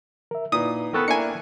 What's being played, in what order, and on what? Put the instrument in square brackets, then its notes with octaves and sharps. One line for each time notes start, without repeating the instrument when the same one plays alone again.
[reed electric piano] A#4 E5
[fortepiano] A#2 [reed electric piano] D#4 E4 B4 [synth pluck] D#6
[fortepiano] B3 A4 A#4 [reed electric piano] G5 C#6 F#6
[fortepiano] A#3 D4 E4 [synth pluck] G#5 C#7